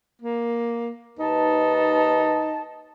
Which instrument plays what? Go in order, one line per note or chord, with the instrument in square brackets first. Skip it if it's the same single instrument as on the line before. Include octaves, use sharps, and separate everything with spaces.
[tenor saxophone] A#3
[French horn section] D#2 B4 [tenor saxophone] D#4 [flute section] A5